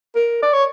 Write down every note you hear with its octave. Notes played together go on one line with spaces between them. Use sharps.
A#4
D5
C#5